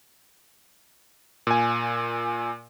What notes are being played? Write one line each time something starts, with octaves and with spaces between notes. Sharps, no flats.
A#2 G#5